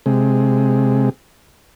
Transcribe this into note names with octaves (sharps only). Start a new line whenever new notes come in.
C3 G#3